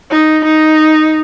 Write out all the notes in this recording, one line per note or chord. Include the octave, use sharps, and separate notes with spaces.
D#4
D#4